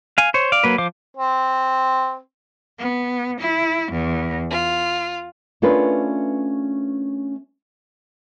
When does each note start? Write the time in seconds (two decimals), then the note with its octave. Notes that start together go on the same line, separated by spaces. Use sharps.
0.18 F5 G#5
0.34 C5 C#5
0.52 D5 F5
0.64 F#3 A#3 B4
0.78 F3 C5 F5 D6
1.17 C4
2.77 B3
3.39 E4
3.90 E2
4.50 F4
5.62 A3 C#4 D4 F4 A#4 B4